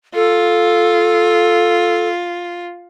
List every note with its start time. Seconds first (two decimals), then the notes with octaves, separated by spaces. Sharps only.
0.15 F4 A4